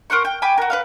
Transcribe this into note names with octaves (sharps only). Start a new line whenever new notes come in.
A#4 C5 F#5 C#6
G5
G5 G#5 B5 D6
F#4 A#4
B4 C#5 F5